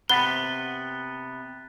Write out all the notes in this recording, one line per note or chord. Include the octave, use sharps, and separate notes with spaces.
C3 B3 F#5 B5 F#6 A6 B6 G7